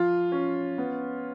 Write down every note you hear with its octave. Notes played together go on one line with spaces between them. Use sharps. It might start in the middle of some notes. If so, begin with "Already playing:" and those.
Already playing: F3 F4
C#4
B3